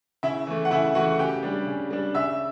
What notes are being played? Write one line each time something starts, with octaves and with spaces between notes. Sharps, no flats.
C#3 E4 E5
E3 A3
F#5
C#3 E4 E5
E3 A3 F#4 F#5
C#3 G4 G5
G3 D4
C#3
G3 D4
C#3 E5 E6